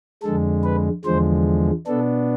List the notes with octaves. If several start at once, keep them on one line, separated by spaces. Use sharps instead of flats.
F2 D3 G#3 A4
B4
E2 D3 F3 G#3 C5
B2 B3 D4 A4